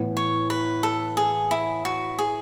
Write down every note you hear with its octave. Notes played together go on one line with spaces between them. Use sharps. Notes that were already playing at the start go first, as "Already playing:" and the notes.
Already playing: A2 E3 B3
C#5
B4
A4
G#4
E4
F#4
G#4